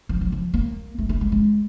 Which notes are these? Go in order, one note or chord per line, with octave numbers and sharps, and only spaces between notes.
F3
F#3
F3
A#3
A3
A3
G#3
G#3